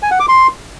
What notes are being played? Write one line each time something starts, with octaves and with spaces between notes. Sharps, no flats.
G#5
F#5
D6
C6